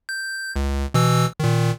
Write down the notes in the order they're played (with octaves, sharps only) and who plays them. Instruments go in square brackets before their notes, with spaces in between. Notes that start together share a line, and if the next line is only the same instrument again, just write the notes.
[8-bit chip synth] G6
C#2
B2 E3 E6
A#2 D#3